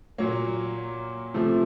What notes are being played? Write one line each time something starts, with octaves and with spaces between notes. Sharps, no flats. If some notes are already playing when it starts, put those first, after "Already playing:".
A#2 F#3 A#3 C#5
C3 F3 A3